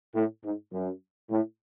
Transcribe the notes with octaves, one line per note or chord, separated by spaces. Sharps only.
A2
G#2
F#2
A2